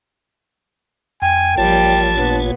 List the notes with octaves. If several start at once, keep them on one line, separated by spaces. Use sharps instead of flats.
F2 G5 G#5
A1 F3 G3 A#3 F4 C#5 A5
A#2 B3 D4